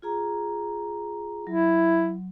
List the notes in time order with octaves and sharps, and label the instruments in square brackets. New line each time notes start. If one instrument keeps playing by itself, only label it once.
[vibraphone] F4 G#4 A#5
[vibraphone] F#3 [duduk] E4